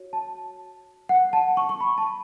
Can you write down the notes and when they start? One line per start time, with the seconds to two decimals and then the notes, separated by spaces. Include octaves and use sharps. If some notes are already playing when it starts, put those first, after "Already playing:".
Already playing: F#4 C#5
0.13 A5
1.09 F#5
1.33 A5
1.57 C#6
1.69 C#6
1.80 B5
1.98 A5